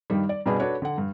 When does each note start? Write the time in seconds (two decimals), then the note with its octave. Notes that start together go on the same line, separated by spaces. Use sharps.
0.10 G2 D#3 G3
0.29 D5
0.46 G2 B2 B3 D4 G#4 B5
0.60 D4 F#4 A4 B4 C#5
0.82 D3 F#5
0.98 G2